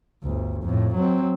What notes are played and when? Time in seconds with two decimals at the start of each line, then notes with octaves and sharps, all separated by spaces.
0.23 G1 D2
0.63 F2 A2
0.95 F#3 C4